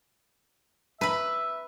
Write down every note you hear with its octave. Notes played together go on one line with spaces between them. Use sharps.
B4 E5 B5